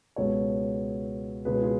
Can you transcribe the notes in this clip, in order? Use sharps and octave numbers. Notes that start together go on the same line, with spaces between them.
C#2 B2 G#3 B3 A4 C#5
C#2 B2 G#3 G#4 B4
F4 G#4